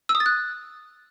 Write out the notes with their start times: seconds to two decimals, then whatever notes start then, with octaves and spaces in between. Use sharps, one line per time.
0.09 E6
0.15 D#6
0.20 A6
0.26 F#6